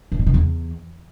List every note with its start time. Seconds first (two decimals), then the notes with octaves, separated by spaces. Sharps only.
0.12 C#3
0.19 A#2
0.26 C3
0.34 E2